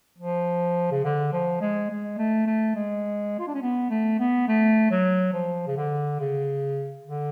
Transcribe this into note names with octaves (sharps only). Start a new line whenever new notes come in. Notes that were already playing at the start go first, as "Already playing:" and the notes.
F3
C#3
D3
F3
G#3
G#3
A3
A3
G#3
F4
D4
C#4
B3
A3
B3
A3
F#3
F3
C#3
D3
C#3
D3